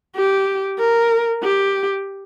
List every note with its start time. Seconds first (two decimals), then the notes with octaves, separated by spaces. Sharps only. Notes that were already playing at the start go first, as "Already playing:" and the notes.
0.16 G4
0.79 A#4
1.43 G4